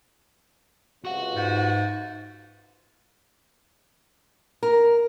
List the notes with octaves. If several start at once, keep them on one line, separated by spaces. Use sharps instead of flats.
C#2 C3 F4 F#4 F#5
G#2
A#4